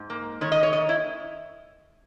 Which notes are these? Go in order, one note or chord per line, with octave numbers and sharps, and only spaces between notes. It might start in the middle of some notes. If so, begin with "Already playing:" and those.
Already playing: G#2
A#3
D#3 C#5
D#5
C#5
D#3 D#5
E4